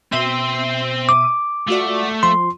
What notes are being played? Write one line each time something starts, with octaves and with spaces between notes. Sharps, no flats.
B2 C4 C5 E5 D#7
D6
A3 F4 F#4 D5
F3 C6